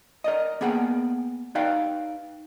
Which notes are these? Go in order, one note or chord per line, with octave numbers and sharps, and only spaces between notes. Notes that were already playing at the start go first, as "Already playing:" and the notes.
A#4 D5 D#5
A#3 B3 G#4 F#5 G5
D#4 B4 D5 F5 G5